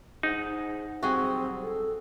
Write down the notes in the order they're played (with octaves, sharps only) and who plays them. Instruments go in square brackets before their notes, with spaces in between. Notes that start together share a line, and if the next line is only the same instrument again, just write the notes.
[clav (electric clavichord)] D#4 [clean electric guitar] G#4 C5 F#5
[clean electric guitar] B1 G3 G5 [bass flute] C4 [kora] F#4 G#4
[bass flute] A4